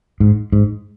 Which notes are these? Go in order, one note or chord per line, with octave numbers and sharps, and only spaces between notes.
G#2
G#2